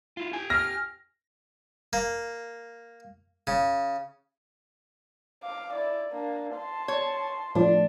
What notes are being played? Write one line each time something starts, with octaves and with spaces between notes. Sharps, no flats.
E4 F4
G4 G5 G#5
F6 A#6
A#3
C#3
F5 D6
E4 D5
A#3 D4
A5 C6
C#5
A2 F3 D4